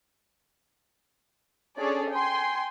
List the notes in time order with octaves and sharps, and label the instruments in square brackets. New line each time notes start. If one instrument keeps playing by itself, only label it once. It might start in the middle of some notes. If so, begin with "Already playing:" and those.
[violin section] C#4 D4 G#4 A4 C#5 D5
G5 G#5 C6